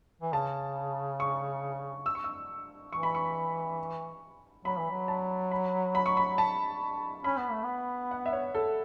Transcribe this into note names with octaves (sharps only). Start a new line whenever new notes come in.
E3
C#3 A5
C#6
E6
C#6
E6
E3 C#6
B5
C#6
F#3 B5
E3
F#3
A5
B5
B5
C#6
B5
A5
C#4 B5
B3
A3
B3
F#5
E5
C#5
A4